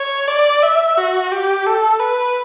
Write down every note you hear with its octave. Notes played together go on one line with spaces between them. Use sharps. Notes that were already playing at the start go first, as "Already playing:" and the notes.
Already playing: C#5
D5
E5
F#4
G4
A4
B4